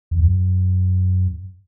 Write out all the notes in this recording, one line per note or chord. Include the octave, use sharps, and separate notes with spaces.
E2
F#2